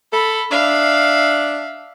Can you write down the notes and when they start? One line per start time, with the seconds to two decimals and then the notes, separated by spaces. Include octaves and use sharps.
0.13 A4 B5
0.51 D4 E5 F5